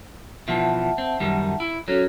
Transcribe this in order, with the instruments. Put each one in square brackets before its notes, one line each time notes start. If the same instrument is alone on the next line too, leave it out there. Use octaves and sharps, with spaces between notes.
[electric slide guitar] B2 E3 F3 [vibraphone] E5 F#5 A5
[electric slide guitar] C4
F#2 D#3 G3
E4
[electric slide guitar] F#3 C#4 [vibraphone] F#4 A4 C#5